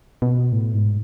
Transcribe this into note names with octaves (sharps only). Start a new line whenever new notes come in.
B2
A2
G#2